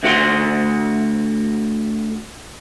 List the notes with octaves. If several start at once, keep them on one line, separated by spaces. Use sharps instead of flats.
D2 D3 F#4 G4 F#5 C6